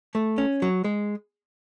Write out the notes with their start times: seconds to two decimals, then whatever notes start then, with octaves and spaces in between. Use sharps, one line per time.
0.15 A3
0.38 C#4
0.62 F#3
0.84 G#3